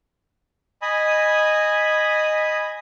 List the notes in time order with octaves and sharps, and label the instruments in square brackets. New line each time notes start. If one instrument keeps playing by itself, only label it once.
[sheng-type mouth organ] D#5 G#5 B5 D#6